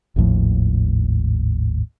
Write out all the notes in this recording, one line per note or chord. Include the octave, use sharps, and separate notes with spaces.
G#1 D#2 A2 F3